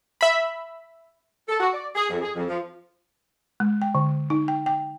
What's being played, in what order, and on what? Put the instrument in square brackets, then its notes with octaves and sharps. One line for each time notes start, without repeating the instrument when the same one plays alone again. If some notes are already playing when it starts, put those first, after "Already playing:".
[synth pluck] E5 B5
[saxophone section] A4
F#4
D5
G#4
F2
G#4
F2
F3
[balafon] G#3
G5
D3
D#4
G5
G5